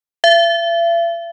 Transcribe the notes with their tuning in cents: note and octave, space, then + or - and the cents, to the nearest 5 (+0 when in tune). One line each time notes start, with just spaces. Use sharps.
E5 +45